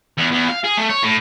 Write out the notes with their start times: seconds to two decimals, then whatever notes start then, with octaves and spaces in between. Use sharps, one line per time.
0.17 E2
0.31 E2
0.48 F5
0.64 G#4
0.77 A3
0.89 C#5
1.03 A2